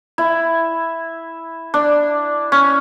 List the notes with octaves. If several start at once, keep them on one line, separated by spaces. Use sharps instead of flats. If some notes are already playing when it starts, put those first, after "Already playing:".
E4
D4
C#4